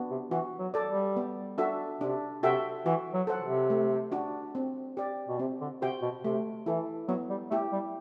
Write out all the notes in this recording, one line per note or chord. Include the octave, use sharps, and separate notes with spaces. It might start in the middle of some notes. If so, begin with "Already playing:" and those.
Already playing: B3 D4 F#4
C3
E3 F#4
F#3
A4 D5
G3
B3
D4 F#4 A4 E5
C3 D4
C3 F#4 A4 E5 G5
E3 F#4
F#3
A4 C5 F#5
C3
A3
D4 F#4
C4
G4 D5
B2
C3 C4
D3
C3 F#4 C5 G5
B2
C3 A3
E3 E4 A4
F#3 B3
G3
A3 E4 G4
G3